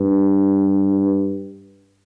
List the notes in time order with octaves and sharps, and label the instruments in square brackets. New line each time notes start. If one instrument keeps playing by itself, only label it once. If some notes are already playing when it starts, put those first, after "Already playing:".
Already playing: [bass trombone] G2